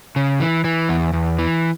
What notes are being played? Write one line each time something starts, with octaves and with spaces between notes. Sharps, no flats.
C#3
E3
E3
E2
E2
E3